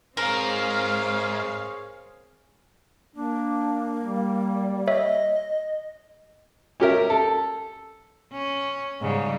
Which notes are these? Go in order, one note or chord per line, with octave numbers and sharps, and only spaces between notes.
G#2 C4 G#4 A#4 C5 C#5 F5
A#3 D4
G3
C#5 D#5 E5
C#4 G4 A#4 E5
A4
C#4
G#2 C#3 G3